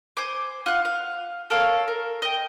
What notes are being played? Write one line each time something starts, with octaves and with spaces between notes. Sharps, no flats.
C5 G#5 D6
F4 F#5 F#6
F5
A4 A#4 C#5 F5
A#4
D#5 G5